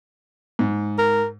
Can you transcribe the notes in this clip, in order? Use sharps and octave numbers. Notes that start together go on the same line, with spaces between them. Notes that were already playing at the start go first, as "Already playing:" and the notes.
G#2
A#4